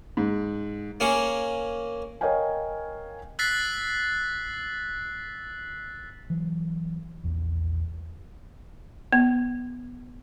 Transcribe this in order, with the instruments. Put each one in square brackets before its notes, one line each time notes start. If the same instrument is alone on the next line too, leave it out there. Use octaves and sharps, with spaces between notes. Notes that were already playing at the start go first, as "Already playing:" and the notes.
[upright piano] G#2
[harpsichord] A#3 C#4 G#4
[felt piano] A#4 C#5 D#5 F5 G5 G#5
[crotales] E6 F#6 A6 B6 C7 F#7
[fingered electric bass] E3 F#3
A#1 E2
[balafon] B3